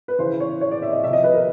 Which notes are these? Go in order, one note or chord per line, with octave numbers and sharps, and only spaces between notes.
B4
C#3 E3 C5
C#5
C#5
D5
E5
D#5
C3 F3 E5
D#5
B4
A#4